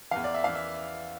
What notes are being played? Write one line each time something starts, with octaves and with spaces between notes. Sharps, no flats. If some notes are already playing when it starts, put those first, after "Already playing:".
E2 E3 F5
D5
E5
E2 E3 F5
E5